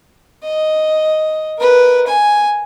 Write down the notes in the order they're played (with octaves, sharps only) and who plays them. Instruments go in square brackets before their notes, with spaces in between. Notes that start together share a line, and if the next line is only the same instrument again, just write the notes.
[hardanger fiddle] D#5
A#4 B4
G#5